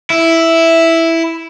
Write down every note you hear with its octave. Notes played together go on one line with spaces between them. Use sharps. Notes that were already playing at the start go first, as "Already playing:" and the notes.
E4